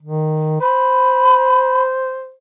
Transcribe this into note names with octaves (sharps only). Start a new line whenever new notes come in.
D#3
C5 B5